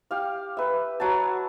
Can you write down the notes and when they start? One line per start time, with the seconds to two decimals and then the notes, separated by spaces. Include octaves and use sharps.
0.11 G4 F5
0.57 B4 E5
1.00 F#3 F#5 A5